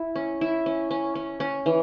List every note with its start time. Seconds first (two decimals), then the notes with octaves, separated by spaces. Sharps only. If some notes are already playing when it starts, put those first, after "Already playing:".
Already playing: E4
0.15 C#4
0.41 E4
0.66 C#4
0.91 C#4
1.15 C#4
1.40 C#4
1.66 E3